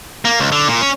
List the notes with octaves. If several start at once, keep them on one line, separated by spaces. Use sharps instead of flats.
A#3
C#2
D3
A#2
C#4